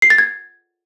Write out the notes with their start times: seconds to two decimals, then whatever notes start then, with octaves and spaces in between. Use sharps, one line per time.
0.02 C7
0.10 A6
0.18 G#6